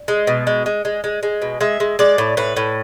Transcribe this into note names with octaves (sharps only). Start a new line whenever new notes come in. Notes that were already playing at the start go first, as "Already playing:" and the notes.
Already playing: D5
G#3
B2
G#3
G#3
G#3
G#3
G#3
B2
G#3 E5
G#3
G#3 D5
A2
A2 B4
A2